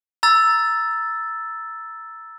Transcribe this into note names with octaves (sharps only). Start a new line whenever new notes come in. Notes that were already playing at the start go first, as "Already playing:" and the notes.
A#5 E6 A6